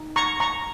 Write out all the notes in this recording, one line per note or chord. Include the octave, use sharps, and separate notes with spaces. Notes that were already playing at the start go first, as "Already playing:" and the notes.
Already playing: D#4
A#5 C#6
A#5 C#6